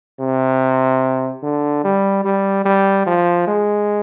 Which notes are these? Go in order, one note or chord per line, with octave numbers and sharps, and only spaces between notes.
C3
D3
G3
G3
G3
F3
G#3